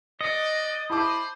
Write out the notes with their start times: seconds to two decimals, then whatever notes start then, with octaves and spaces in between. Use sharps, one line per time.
0.21 B3 D5 D#5 C#7
0.90 E4 C5 A5 B5 D6